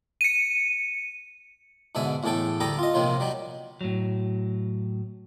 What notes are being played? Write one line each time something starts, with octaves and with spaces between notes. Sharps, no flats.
C#7 D#7
G#2 B2 D3 E5 G#5
E2 A2 A3 G#4 A4 G5
D2 G3 A4 G5 A#5 D#6
F4 D#5
A#1 C3 D#3 F4 C#5
F#3 G3 D#4
A2 F#3